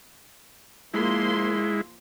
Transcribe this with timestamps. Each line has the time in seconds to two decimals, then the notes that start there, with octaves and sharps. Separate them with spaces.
0.94 F3 G#3 A#3 E4 C6